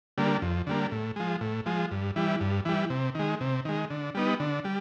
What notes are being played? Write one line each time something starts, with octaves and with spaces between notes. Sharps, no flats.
D3 G3 A#3
F2
D3 G3 A#3
A2
F3 G#3
A2
F3 G#3
G2
E3 G3
G2
E3 G3
C3
D#3 G#3
C3
D#3 G#3
D3
G3 B3 D#4
D3
G3